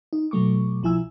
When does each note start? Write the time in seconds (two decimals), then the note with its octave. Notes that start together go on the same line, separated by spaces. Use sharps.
0.13 D#4
0.31 B2 F#3 A3 C#6 D6
0.83 B1 F3 E4 G#5 E6